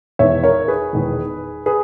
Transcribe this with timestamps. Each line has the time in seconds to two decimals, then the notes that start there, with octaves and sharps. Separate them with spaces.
0.19 E1 E2 D#3 C#5 E5
0.44 A#4 C#5
0.68 G#4 B4
0.93 E1 E2 D#3
1.66 G#4 B4